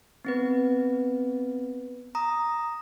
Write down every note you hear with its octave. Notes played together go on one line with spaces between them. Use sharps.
B3 C4 B4
A#5 D#6